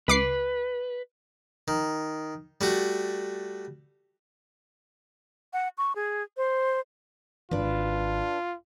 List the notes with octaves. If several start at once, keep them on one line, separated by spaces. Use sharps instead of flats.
C#2 B4 D6 C7
D#3
G3 A3 F#4
F#5
C#6
G#4
C5
G#1 D4 F4 B4